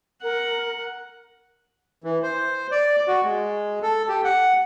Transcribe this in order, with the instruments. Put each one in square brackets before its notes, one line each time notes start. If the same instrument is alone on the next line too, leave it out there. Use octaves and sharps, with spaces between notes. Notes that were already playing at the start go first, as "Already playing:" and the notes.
[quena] A#4 [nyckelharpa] F#5
[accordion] E3
C5
D5
F#4
G#3
A4
G4
F#5